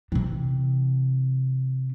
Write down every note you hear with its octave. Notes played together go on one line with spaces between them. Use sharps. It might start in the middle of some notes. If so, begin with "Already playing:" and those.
C3 E3